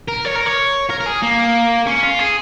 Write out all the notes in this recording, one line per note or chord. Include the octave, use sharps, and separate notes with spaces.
A#4
C#5
A#4
C#5
A#4
A#4
G#4
A#3
C#4
F4
G#4